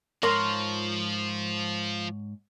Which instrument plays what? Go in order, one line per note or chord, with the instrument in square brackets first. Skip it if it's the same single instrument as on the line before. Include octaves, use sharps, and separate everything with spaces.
[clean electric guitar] G#2 C#5 [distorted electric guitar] F3 [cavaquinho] A#4 C6